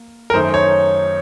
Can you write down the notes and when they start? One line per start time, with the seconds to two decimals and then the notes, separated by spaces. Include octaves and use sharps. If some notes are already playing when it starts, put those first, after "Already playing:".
Already playing: A#3
0.30 A#4
0.33 F#2 D#3 A3 D#4 C5
0.54 C#5